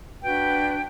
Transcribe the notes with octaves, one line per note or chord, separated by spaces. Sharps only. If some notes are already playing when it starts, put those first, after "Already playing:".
D4 F#4 B4 G5